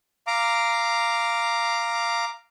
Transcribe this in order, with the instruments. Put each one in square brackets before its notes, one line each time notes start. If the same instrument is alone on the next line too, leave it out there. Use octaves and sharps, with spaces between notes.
[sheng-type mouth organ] F5 A#5 D6